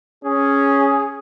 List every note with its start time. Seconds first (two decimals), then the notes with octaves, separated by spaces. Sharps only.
0.24 C#4 G#4